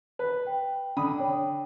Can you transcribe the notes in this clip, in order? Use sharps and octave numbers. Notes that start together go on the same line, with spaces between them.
B4
G5
D3 B5 D#6
C#5 G5